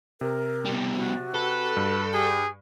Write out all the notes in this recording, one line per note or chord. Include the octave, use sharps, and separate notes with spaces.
C3 A#4
B2 G3
F#4
A4 B4
G2
G4 G#4